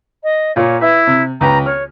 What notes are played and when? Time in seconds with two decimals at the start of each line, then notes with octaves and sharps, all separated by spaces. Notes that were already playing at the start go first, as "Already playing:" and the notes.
0.24 D#5
0.56 A#2 F4 C#5
0.81 E4 B4 E5
1.07 C3
1.41 C#2 B4 G5 A#5
1.66 C#5 F6